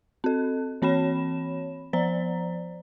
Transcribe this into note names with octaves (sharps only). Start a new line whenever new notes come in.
C4 A4
E3 C4 C#5 B5 E7
F3 C5 D5 A#5